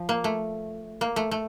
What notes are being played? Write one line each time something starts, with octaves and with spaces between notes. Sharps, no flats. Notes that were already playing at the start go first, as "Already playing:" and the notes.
Already playing: F3
A#3
A3
A#3
A3
A3